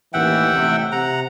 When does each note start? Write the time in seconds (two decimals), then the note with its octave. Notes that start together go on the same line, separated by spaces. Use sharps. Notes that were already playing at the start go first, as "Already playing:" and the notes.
0.13 A1 D#2 E3 E5 F#5 G5
0.53 A1 C3
0.92 C3 F#5 A#5